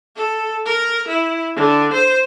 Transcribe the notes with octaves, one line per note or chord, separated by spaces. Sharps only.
A4
A#4
E4
D3
C5